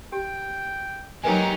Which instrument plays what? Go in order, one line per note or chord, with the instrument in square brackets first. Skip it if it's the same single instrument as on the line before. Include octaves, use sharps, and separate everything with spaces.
[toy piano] G4 [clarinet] G5
[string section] F#3 D#4 [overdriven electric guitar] G#3 G4 [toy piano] A#4 B4 G#5